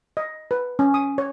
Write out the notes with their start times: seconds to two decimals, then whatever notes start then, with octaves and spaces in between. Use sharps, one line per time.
0.17 D#5
0.51 B4
0.79 C#4
0.94 D#6
1.18 C#5